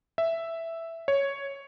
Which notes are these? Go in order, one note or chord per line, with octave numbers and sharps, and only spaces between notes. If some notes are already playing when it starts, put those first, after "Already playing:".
E5
C#5